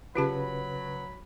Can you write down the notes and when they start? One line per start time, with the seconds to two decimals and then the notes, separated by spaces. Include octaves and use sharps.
0.16 C#3 F#3 F4 G4 B4 A5 B5